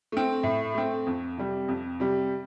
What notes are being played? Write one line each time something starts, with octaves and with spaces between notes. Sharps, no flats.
A3 C4
A2
A3 C4
F2
C3 G3
F2
C3 G3